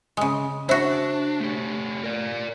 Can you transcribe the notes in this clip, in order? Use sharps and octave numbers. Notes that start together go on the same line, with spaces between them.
C#3 G#3
D4 E4 F#4 C5
A3 G4
A#4 D5